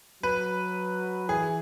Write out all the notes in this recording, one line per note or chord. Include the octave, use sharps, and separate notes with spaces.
F#3 B4
E3 G#4